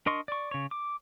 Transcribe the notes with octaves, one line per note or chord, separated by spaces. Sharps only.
D4 A#4 D#5 C6 C#6
D5 C#6
C#3 C#5
D6